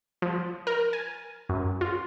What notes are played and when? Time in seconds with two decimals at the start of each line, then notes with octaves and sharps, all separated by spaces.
0.22 F3
0.67 A#4
0.93 G#5
1.49 F#2
1.81 F4